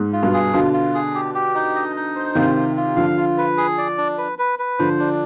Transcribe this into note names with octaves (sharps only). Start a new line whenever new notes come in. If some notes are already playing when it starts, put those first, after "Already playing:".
Already playing: G#2
F4
G2 B2
G#4
B2 D3 F4
F4
G#4
G4
G4
D#4
D#5
D#4
C5
C3 D#3 F4
F4
F4
D3 F3 F5
F4
B4
G#4
D5
D4
B4
B4
B4
D3 F3 C5
D4